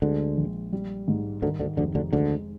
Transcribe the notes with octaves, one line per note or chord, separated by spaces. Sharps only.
D2 D3 G#3
A#1
G3
G#2
D2 D3 D#3
D2 D3
F1 D2 D3
D2 D3
D2 D3 G#3